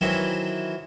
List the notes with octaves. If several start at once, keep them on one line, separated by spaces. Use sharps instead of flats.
D#3 E3 F#3 C4 E4